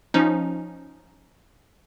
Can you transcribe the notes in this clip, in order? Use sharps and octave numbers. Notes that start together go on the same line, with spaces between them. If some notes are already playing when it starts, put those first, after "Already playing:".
F3 C#4 D#4